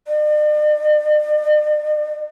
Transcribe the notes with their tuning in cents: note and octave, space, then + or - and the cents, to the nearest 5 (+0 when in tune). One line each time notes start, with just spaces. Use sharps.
D5 +45